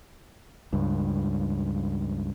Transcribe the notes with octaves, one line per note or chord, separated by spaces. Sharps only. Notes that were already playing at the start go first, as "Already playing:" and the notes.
C#2 G2